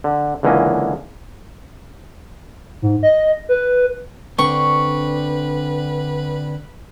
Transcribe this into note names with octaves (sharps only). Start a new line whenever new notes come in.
D3
C#2 D3 E3 A#3 C#4 D#5
G#2
D#5
B4
D3 C4 D4 B4 C#6